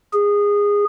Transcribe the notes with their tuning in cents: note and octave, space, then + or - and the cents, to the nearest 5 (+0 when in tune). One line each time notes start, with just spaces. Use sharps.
G#4 -20